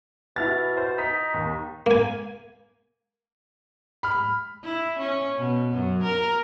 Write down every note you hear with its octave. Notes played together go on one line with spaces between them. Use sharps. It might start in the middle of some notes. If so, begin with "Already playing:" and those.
B2 E4 F6 A6
C5
D#4 B6
D#2
A#3 G#5
B5 F6
E4
C#4
B2
F#2
A#4